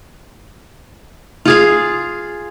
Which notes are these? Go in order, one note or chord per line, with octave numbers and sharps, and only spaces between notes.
F4 G#4 F5